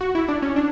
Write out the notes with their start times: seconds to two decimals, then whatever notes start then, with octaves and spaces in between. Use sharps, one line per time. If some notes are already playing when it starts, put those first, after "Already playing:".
0.01 F#4
0.15 E4
0.28 D4
0.42 C#4
0.56 D4